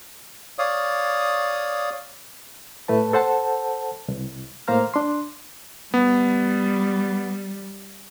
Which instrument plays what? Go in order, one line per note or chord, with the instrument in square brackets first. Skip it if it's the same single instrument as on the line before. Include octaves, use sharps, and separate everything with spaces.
[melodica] C#5 D5 F5 D#6
[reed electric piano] A2 A3 B4 A5
A4 C5 F#5 A5
C2
A2 A#3 C5 F5 A#5 F6
D4 C6
[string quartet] G3 [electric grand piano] B3